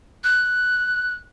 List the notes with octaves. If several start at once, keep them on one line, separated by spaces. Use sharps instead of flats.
F#6